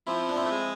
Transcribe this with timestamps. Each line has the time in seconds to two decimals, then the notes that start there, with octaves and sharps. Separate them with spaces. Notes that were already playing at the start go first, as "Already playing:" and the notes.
0.07 F3 C4 E4
0.29 D4
0.36 C4 E4
0.46 A3
0.51 G#3